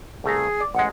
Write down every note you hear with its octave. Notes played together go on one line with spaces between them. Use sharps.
C2 A3 G#4 A#5
D5
A1 G#3 F#5